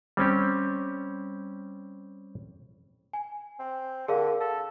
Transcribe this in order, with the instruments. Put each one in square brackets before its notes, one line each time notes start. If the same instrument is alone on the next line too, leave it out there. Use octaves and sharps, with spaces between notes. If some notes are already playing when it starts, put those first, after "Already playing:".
[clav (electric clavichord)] G3 C4 C#4 G4
[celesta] G#5
[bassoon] C4
[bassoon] D3 [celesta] G#4 A#4 F5
[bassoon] A4 [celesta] F5